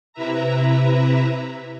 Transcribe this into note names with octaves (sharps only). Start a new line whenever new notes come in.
C3 E4 B4 E5 A#5